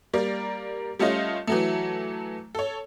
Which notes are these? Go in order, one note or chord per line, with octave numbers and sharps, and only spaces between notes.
G3 A#3 D5
G3 A3 C#4 F4 D#5
E3 F#3 A3
A4 C#5